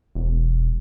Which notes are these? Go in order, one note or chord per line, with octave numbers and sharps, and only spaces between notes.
E1